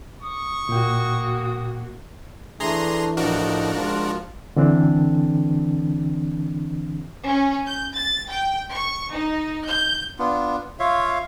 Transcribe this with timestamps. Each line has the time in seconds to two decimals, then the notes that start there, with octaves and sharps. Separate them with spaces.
0.22 C#6 D#6
0.69 A#2 A#3 F#4 G5
2.60 E3 A3 D4 G#4 A#5 C6
3.17 A2 F3 D4 D#4 F#4 A#4
3.74 F3 G#3 F4
4.57 D3 E3 C4 D4
7.26 C#4
7.67 G6
7.95 A6
8.29 G5
8.71 C#6
9.12 D#4
9.67 G6
10.19 B3 D4 F4
10.80 F4 C#5 E5 F5